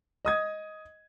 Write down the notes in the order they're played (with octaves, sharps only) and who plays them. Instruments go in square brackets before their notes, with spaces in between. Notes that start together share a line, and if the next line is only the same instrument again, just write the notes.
[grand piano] D#5 D#6 G#6